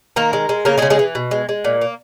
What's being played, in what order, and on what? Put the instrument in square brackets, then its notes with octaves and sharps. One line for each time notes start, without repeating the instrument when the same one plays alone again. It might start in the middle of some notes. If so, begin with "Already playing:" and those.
[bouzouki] D#3 A#3 A#4
G#3
G#3
C#3 A#3 A#4
G#3 G#4
C#3
G#3 G#4
E3
B2
G#3
G#3
A#2
A#3